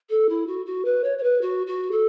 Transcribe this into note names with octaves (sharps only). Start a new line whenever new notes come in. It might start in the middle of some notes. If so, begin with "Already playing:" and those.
A4
E4
F#4
F#4
B4
C#5
C#5
B4
F#4
F#4
A4